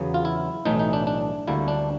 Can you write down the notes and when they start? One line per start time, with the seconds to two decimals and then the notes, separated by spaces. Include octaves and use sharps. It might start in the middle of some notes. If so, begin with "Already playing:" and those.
Already playing: E2 C#3 F#3 B3
0.14 F4
0.25 E4
0.65 B1 A2 E3 A3 D#4
0.79 D#4
0.93 D4
1.07 D4
1.48 D2 D3 G3 A#3 E4
1.68 D4